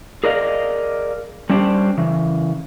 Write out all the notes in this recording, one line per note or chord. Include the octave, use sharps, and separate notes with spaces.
G#4 A#4 D5 D#5 F5
G3 C#4 D4 G4 C5
C#3 E3